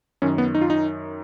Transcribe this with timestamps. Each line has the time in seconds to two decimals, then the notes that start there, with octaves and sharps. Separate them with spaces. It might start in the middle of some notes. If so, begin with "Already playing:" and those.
0.22 F#2 D#3 C#4
0.38 B3
0.55 D#4
0.61 F4
0.70 D#4